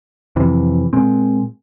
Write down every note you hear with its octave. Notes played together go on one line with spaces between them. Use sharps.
F2 C3 E3
A#2 G#3 C4